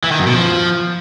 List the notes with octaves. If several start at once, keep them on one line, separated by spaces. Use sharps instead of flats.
E3
D#3
F#2
B2
F3